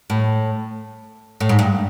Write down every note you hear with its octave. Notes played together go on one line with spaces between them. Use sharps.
A2
A2
G#2
G2